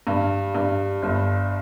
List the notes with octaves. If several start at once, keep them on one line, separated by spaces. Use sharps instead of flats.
G2
G2
G1